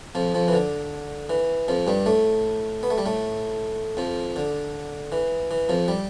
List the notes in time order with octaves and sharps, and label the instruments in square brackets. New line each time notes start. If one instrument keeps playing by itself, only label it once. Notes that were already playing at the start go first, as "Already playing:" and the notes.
[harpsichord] F2 F3
F2 F3
E3
D3
E3
F2 F3
G2 G3
A2 A3
B3
A3
G3
A2 A3
F2 F3
D3
E3
E3
F2 F3
G3